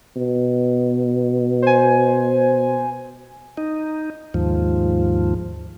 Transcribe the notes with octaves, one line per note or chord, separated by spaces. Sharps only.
B2
C5 G#5
D#4
D#2 G#2 F3